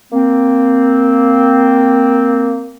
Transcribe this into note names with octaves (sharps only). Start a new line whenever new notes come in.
A#3 C4